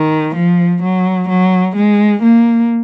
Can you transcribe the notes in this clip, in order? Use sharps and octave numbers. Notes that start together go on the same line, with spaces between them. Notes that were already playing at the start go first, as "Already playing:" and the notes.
Already playing: D#3
F3
F#3
F#3
G#3
A#3